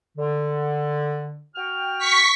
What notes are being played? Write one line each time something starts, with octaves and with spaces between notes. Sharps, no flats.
D3
F#4 G5 F6
C#6 B6